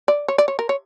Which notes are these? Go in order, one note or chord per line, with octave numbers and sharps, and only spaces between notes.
D5
C#5
D5
C#5
A#4
C#5